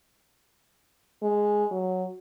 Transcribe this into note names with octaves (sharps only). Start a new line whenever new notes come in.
G#3
F#3